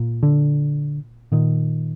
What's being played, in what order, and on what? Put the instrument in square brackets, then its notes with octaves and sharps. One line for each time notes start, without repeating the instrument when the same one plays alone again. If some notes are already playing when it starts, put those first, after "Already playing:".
Already playing: [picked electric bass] A#2
D3
A#2 D#3